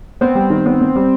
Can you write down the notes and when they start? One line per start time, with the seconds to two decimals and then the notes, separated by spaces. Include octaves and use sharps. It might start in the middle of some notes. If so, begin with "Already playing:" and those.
0.21 B3 C4
0.35 G3
0.50 D#3
0.66 B3
0.81 B3
0.96 G3